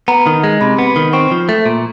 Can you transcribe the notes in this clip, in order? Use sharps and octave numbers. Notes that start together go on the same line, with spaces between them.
B3 A#5
D#3
G#3
C3 B5
B3
B5
D#3
C4 C#6
F3
A3
A#2